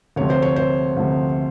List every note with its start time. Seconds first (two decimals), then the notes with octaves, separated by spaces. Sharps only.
0.16 D2 C3 F3 C#5
0.30 C5
0.42 C#5
0.56 C5
0.97 D2 C3 F3